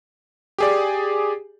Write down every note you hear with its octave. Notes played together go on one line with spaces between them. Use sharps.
G4 G#4 D5